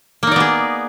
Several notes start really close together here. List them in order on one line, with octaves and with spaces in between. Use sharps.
A#3 D#4 D5 B3 G#4